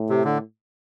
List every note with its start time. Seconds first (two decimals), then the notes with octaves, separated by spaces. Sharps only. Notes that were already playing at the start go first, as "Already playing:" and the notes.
Already playing: A2
0.09 C3
0.24 D3